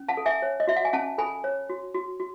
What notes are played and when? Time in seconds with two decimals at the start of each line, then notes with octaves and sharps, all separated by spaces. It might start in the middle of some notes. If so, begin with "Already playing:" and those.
Already playing: C#4
0.09 F#5 A5
0.17 A4
0.26 E5 G#5
0.42 C#5
0.60 D#5
0.67 F#4 E5
0.76 F#5
0.85 G#5
0.93 C#4 F#5 A5
1.18 A4 G#5 B5
1.44 C#5
1.70 F#4
1.94 F#4
2.20 F#4